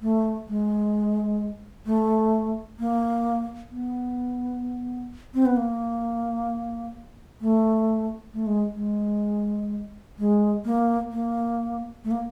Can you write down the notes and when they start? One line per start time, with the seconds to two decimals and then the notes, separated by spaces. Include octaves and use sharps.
0.02 A3
0.48 G#3
1.86 A3
2.79 A#3
3.71 B3
5.34 C4
5.46 B3
5.57 A#3
7.41 A3
8.34 A3
8.47 G#3
8.73 G#3
10.19 G#3
10.65 A#3
11.12 A#3
12.04 A3
12.11 A#3